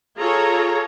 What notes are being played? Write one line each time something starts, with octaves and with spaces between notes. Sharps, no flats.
F4 G#4 A4 C#5 A#5